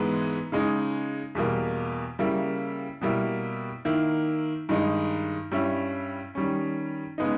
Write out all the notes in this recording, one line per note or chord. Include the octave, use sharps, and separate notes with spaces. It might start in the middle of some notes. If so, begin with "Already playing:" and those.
Already playing: G#2 E3 G#3 B3
C#3 G#3 D#4
E2 B2 G3 A#3
C#3 G3 A#3 E4
B2 G3 A#3 E4
D#3 A#3 E4
G2 D#3 G#3 D#4
G2 G3 C#4 E4
D#3 G3 C#4
C#3 G#3 B3 D#4